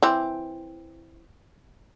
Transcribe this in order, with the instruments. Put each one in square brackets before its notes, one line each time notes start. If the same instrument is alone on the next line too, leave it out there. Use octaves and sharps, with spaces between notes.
[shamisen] E3 C4